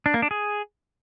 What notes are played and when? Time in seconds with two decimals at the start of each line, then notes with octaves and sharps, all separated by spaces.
0.06 D4
0.14 A#3
0.22 D4
0.31 G#4